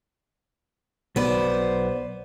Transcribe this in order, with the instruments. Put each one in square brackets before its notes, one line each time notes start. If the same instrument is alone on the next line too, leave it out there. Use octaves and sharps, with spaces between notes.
[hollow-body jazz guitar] B1 B3 B4 [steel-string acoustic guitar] C5 D5